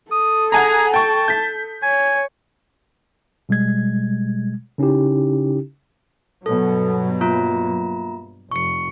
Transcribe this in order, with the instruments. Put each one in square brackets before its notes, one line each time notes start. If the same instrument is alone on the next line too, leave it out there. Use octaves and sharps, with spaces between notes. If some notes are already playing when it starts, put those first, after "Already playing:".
[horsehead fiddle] A4 [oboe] D#6
[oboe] G#4 [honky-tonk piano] F#5 G#5 A#5
[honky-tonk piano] G5 C#6 [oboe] A5
[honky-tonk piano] G6 B6
[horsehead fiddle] C#5 [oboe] G#5
[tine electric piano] B2 G3 G#3 G#6
C#3 C#4 D#4 E4 G4
[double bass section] G2 B2 F#3 [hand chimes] A4
[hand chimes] A#3 F4 A#5
[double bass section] F1 [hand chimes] C#6 C#7